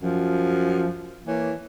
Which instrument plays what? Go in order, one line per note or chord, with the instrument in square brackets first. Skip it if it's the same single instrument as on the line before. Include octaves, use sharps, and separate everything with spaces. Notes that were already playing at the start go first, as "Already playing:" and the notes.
[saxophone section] F#2 F3
E3 A#3 C#5